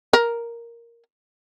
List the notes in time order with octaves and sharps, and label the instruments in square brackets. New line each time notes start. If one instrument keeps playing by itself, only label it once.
[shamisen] A#4